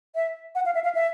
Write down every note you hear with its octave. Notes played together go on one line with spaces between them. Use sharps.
E5
F#5
F5
E5
F5
E5